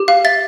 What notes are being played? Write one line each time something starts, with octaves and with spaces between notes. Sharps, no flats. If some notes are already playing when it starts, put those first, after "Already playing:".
Already playing: G4
F5
E5 A6